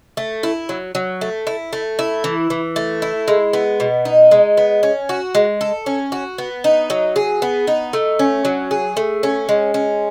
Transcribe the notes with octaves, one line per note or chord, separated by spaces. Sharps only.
A3
E4
F#3
F#3
A3
E4
A3
E4
E3
E3
A3
E4
G#3
B3
B2
D#4
G#3
B3
C#4
F#4
G#3
A4
C#4
F#4
B3
D#4
F#3
G#4
B3
D#4
A3
C#4
F#3
G#4
A3
C#4
G#3
C#4